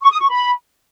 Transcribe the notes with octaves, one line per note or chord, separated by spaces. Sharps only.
C#6
D#6
C#6
B5